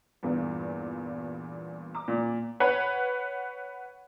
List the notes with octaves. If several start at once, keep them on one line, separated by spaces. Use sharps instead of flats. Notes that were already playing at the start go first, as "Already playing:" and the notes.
E2 G2 A#2
A#5 D6
A#2
B4 C#5 F#5